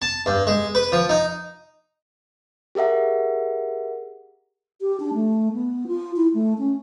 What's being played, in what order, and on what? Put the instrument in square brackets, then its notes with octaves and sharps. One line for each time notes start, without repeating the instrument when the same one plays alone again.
[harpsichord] A5
G2
G#3
B4
F3
D#4
[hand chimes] G4 G#4 A#4 E5 F#5
[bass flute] G4
D4
A3
B3
F4
E4
A3
C#4